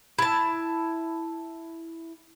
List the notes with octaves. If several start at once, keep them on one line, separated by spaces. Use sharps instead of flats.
E4 A5